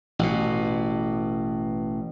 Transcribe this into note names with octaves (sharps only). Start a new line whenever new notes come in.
A1 B2